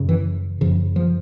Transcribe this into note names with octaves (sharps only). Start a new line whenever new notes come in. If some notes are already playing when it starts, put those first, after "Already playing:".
Already playing: F#2 C#3
E3
F#2 C#3 F3
F3